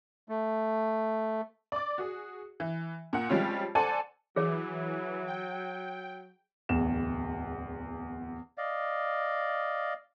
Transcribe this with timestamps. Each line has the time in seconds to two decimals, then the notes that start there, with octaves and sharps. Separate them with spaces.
0.29 A3
1.72 D5 D6
1.98 F#4 G#4
2.60 E3
3.13 A#2 F#5
3.29 F3 G3 G#3 C4 C#4 F4
3.75 A4 C5 D5 F#5 G#5 A5
4.36 E3 F#3 G#4 C#5
5.27 G5
6.69 D1 E2 E7
8.58 D5 D#5 F5